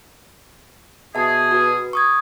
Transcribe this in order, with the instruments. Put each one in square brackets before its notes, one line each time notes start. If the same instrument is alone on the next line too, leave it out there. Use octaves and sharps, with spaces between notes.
[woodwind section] B2 G#4 [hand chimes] E5 A5
[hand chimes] F#4 B4
C#6 D#6 G#6